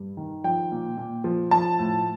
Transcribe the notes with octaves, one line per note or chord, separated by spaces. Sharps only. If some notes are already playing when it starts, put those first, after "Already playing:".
Already playing: G2
D#3
F3 G5
A#2
A#2
F3
F3 A5
A2